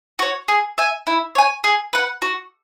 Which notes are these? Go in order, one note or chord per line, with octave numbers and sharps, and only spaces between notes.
F#4 C#5
G#4
E5 G#5
E4
C#5 G#5
G#4
B4 F#5
F#4